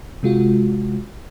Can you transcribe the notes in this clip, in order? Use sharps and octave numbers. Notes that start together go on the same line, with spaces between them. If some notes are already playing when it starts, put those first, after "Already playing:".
C3 G#3 F4 F#4